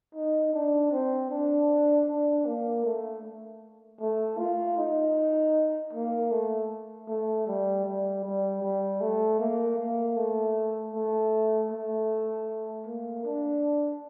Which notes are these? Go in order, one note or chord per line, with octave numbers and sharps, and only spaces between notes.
D#4
D4
C4
D4
D4
A#3
A3
A3
F4
D#4
A#3
A3
A3
G3
G3
G3
G3
A3
A#3
A#3
A3
A3
A3
A#3
D4